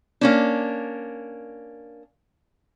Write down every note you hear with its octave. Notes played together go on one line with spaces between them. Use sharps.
A#3 C#4 D4